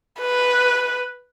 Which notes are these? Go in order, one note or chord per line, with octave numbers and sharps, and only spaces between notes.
B4